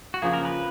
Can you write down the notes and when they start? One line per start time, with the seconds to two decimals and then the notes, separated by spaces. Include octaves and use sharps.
0.14 F#4
0.22 C#3 F3 A#3 G#4
0.33 A#4
0.45 B4